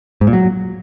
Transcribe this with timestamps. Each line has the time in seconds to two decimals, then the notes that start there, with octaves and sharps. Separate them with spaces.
0.21 G#2
0.27 A#2
0.33 F#3